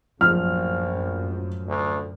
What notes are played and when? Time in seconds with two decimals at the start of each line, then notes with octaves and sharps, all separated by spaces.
0.21 A#1 F#2 A2 F3 F6
1.67 D2